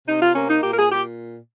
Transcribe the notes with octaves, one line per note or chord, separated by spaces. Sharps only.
C3 D#4
F4
A#3 C#4
D#4
A#2 G4
A#4
G#4
A#2 G4